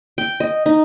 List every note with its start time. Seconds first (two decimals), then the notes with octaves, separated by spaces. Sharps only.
0.18 G5
0.40 D#5
0.66 D#4